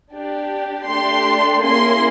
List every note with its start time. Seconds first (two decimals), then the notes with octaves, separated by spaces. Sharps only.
0.12 D4 G4
0.87 A3 D4 G4 C6
1.62 A#3 C#4 E4 G#4 C6